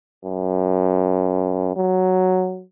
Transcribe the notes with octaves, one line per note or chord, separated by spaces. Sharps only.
F#2
F#3